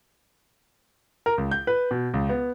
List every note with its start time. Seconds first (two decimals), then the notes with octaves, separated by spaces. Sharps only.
1.26 A#4
1.38 C#2
1.51 G6
1.67 B4
1.91 B2
2.14 C#2
2.29 B3